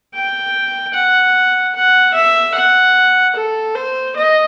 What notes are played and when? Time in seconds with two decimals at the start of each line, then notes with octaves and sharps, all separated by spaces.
0.14 G5
0.94 F#5
1.75 F#5
2.14 E5
2.55 F#5
3.36 A4
3.75 C5
4.16 D#5